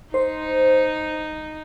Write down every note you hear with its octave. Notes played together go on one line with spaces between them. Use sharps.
D#4 C5